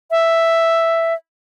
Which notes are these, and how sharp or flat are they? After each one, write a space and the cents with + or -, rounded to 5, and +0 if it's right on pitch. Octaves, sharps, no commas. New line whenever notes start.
E5 +5